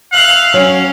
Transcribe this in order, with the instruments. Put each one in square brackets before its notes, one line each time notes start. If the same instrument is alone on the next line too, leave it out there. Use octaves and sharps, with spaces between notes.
[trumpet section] E5 F5 [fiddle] F#6
[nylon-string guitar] F#3 [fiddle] C#4